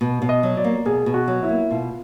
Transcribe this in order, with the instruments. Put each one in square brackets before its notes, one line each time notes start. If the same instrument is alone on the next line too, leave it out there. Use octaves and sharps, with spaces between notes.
[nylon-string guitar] B2
B2
[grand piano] D#5
[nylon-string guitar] F#3
[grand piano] D5
[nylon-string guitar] A#3
[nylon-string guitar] B2 [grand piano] G#4
[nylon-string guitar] B2
[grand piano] F#4
[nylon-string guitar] F#3
[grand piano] E4
[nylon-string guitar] A#3
[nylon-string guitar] B2 [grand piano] F4